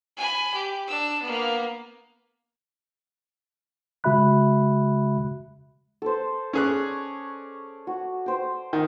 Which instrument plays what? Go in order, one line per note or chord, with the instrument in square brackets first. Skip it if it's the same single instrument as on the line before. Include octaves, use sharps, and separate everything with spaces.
[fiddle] G#5 B5
G4
D4 E6
A#3 B3
[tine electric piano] C#3 G#3 F#4 E5 B5 F#6
[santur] A4 C5
[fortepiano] C#4 G#4 F#6 [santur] C#5 D5
[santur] F#4
C5 G5
[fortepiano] D#3